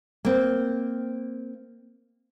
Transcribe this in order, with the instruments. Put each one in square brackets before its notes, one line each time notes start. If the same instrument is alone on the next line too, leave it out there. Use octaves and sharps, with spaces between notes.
[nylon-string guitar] A#3 C4